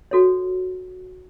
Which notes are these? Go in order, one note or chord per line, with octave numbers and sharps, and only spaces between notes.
F#4 A4 C#5